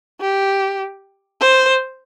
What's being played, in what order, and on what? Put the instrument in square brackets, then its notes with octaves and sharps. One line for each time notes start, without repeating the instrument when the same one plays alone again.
[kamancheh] G4
C5